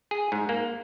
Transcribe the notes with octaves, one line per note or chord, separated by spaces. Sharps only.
G#4
G#2
A#3